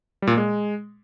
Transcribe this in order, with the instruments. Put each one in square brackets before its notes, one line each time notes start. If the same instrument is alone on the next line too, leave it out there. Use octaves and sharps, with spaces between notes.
[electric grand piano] G3
A#2
A#3
G#3